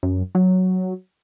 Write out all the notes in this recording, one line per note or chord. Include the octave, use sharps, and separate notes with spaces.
F#2
F#3